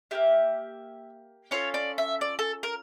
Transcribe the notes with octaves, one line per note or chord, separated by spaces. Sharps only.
A#3 E4 G4 E5
C#4 F4 A4 C#5
D5
E5
D5
A4
A#4